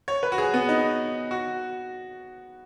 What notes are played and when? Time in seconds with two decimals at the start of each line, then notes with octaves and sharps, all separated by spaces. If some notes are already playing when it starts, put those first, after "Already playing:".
0.08 C#5
0.23 B4
0.32 F#4
0.38 G#4
0.54 B3
0.69 D#4
1.31 F#4